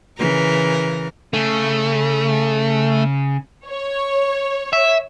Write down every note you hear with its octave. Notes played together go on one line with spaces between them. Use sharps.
C#3 E3 A#4
C#3 A3 C#4
C#5
E5